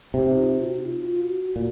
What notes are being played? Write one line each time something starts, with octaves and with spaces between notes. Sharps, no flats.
C3 D#4
F4
F#4
D#4
F4
F#4
A#2 F#4